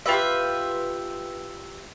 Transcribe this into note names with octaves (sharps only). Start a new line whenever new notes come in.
F4 G4 B4 E5